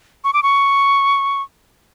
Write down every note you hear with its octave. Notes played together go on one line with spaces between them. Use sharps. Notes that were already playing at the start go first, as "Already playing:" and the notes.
C#6
D6
C#6